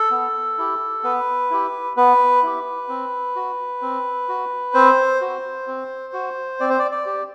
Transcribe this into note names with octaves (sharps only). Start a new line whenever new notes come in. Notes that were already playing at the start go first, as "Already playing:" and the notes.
Already playing: A4
B3
E4 G4
B3 B4
E4 G4
B3 B4
E4 G4
C4
F#4
C4
F#4
C4 C5
F#4
C4
F#4
C4 D5
C5
D5
D5
G4